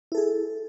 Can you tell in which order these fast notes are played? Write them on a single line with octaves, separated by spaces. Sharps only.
E4 A4 G#4